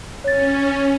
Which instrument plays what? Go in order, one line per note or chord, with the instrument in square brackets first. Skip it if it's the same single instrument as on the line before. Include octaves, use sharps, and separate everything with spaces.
[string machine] C#4 [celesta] C#5 A6